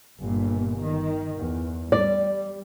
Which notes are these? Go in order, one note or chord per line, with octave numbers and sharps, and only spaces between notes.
G1 G2 A#2
D#3
E2
G3 D5